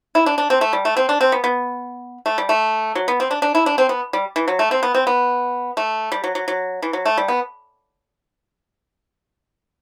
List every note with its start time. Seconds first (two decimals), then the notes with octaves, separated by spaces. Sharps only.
0.15 E4
0.26 D4
0.38 D4
0.50 C4
0.61 A3
0.73 G3
0.85 A3
0.97 C4
1.09 D4
1.21 C4
1.32 B3
1.44 B3
2.26 A3
2.38 G3
2.49 A3
2.95 F#3
3.08 B3
3.20 C4
3.31 D4
3.42 D4
3.55 E4
3.66 D4
3.78 C4
3.89 B3
4.13 G3
4.36 E3
4.48 F#3
4.59 A3
4.71 C4
4.83 B3
4.95 C4
5.07 B3
5.77 A3
6.12 G3
6.24 F#3
6.35 F#3
6.48 F#3
6.82 E3
6.93 F#3
7.06 A3
7.18 G3
7.28 B3